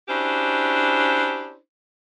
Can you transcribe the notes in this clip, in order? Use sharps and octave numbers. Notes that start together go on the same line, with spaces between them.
C#4 D4 E4 F#4 G4 C5